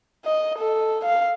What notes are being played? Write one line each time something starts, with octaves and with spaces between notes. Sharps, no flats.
D#5
A4
F5